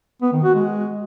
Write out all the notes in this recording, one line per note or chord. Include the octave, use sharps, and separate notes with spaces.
B3
D#3
F#4
G#3